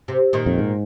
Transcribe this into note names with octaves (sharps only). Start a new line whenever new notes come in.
C3
A#2 D#3
F2
G#2